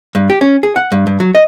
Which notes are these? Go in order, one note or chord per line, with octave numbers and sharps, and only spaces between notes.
G2
G4
C#4
G#4
F#5
G2
G2
F#3
D#5